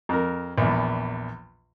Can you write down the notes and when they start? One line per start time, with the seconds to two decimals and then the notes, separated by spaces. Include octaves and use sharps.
0.09 F2 A#4
0.58 A#1 E2